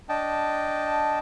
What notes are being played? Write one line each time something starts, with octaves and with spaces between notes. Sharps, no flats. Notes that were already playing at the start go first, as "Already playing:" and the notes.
D4 D#5 G5 A5